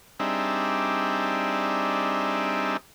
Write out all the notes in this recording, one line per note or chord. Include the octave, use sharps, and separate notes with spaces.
G3 C4 D4 D#4 G#4 E5